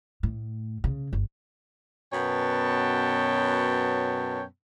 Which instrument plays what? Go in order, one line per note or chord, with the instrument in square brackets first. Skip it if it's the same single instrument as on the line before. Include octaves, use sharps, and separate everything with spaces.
[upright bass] A2
C#3
G1
[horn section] F#2 B2 B3 C#5 G5 A5